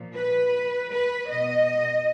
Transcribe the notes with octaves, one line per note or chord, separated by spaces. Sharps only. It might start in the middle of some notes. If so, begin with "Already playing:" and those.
Already playing: A#2 F3
B4
B4
B2 D#5